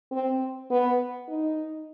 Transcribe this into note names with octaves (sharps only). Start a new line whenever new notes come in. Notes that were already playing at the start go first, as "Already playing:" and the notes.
C4
B3
D#4